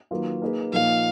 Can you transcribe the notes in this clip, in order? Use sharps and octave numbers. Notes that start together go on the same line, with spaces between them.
D#3 F#3 A#3 F4 B4
A#3 D#4 G#4 B4
A#2 F3 A#3 D#4 F5